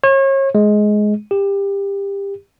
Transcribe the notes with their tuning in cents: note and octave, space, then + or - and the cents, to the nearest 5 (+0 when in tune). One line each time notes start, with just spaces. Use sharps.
C#5 -35
G#3 +15
G4 +25